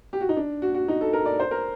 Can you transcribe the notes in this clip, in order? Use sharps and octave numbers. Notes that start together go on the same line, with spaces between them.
G4
F#4
D#4
D4
F#4
F#4
D#4
A4
A#4
D5
C5
A#4